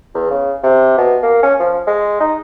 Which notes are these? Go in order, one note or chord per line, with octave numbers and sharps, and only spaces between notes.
E2
C#3
C3
B2
A#3
C#4
F3
G#3
D#4